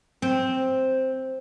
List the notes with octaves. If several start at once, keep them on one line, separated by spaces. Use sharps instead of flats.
C4